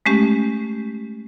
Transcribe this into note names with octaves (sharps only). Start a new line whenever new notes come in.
G#3 A3 C#4 G4